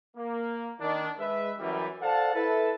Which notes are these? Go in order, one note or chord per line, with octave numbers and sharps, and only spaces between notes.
A#3
D#3 D4
G#3 B4 E5
F#2 E3 G3
A4 C5 D5 F5 F#5 A5
E4 A4 B4 A5